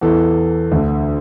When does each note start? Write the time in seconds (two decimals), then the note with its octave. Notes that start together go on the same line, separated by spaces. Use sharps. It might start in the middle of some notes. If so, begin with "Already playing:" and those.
0.01 E2 E3 A4
0.72 D2 D3